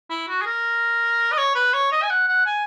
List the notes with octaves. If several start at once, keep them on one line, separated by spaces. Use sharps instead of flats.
E4
F#4
G#4
A#4
D#5
C#5
B4
C#5
D#5
G#5
F#5
F#5
G#5